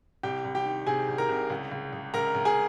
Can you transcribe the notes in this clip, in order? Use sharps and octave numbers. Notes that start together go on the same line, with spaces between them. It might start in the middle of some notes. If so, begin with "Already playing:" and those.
C2 G4 G5
C2
G4 G5
D#3
C3 G#4 G#5
C2
A#4 A#5
C2
C#2
C#2
C#2
C#2 A#4 A#5
C#2
G#4 G#5